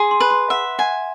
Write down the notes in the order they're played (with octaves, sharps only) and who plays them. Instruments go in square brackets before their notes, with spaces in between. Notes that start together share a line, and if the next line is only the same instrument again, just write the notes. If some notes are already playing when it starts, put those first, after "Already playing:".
Already playing: [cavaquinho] G#4 [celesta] C6
[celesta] C6
[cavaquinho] B4
[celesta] C6
[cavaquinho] E5 [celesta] F#5
[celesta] F#5 [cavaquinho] G#5